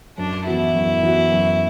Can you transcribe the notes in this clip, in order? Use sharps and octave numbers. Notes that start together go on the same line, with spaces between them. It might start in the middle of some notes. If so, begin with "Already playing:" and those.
F#2 D4
E3 B3 E4 F#4
F#2
E3 B3 F#4
F#2